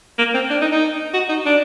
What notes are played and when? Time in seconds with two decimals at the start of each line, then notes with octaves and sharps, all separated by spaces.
0.18 A#3
0.34 C4
0.50 D4
0.61 D#4
0.72 D#4
1.14 F#4
1.29 D#4
1.46 D4